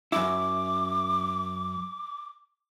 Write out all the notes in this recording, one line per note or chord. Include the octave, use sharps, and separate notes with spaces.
F#2 E4 D6